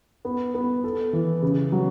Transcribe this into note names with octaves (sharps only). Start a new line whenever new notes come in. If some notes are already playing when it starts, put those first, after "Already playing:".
B3
B3
A4
E3
C#3
F#3